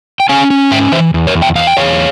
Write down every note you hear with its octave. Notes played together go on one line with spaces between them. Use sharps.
G5
C#4 F5 G#5
C#4
G#2 E5 G5
E3 C5 E5
E2
A#4 C#5
E2
E5 G5
E2 F5
G5
E2 C#5 F5